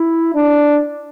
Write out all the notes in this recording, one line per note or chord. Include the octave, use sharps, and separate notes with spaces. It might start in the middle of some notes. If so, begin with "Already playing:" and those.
Already playing: E4
D4